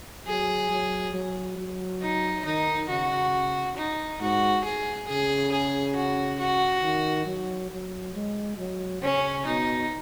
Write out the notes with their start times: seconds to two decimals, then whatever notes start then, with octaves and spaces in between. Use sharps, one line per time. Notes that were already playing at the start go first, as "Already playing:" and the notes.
0.27 F#3 G#4
0.70 F#3
1.13 F#3
1.58 F#3
2.01 D#4
2.45 D#3 D#4
2.89 C#3 F#4
3.77 D#4
4.21 G#2 F#4
4.64 G#4
5.08 C#3 G#4
5.52 G#4
5.95 F#4
6.39 F#4
6.83 D#3
7.27 F#3
7.70 F#3
8.14 G#3
8.58 F#3
9.02 C#3 C#4
9.45 B2 D#4